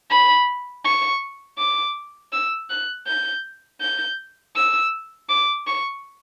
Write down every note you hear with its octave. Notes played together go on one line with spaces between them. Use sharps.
B5
C#6
D6
E6
F#6
G6
G6
E6
D6
C#6